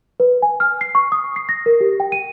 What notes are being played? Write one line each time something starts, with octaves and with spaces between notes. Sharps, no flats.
B4
G#5
F6
C7
C#6
D#6
C7
A#6
A#4
G4
G5
D#7